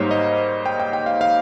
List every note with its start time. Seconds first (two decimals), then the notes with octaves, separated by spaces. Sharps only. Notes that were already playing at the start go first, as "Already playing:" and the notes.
Already playing: G#2 G3 A#3 D#4 C5 C#5
0.11 D#5
0.66 G5
0.80 G5
0.93 G5
1.06 F5
1.21 F5